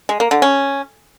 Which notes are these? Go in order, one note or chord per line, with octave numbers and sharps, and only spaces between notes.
G#3
A#3
D3
C#4